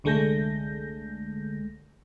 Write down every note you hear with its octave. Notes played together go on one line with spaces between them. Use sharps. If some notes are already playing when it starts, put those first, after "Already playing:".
C2 D3 G#3 A3 G6 A#6